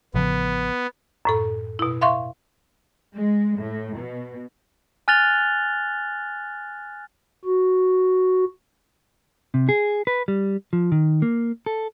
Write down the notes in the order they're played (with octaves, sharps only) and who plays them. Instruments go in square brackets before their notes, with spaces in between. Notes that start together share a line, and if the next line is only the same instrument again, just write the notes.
[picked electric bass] A1 C#3 F3 [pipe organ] B3
[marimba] F#2 A2 A4
B2 E4
E5 F5 C6 C#6
[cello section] G#3
A2
B2
[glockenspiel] G#5 F6 F#6 A6 F7 G7
[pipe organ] F#4
[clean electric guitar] C3
G#4
B4
G3
F3
D#3
A#3
A4